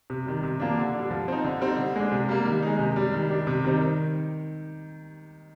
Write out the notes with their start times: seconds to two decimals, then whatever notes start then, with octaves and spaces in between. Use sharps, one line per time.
0.10 C3
0.26 D#3 G3
0.43 C3
0.60 F3 A#3 D4
0.77 D3
0.94 G3 D4
1.10 F3
1.28 C4 D#4
1.44 D3
1.61 G3 C4 D#4
1.78 D3
1.96 G#3 D4
2.12 C3
2.29 G3 A#3
2.45 D#3
2.62 G#3 D#4
2.79 C3
2.96 G3 D4
3.13 D#3
3.30 G3 D4
3.47 C3
3.64 D#3 G3 C4 D#4
3.81 D#3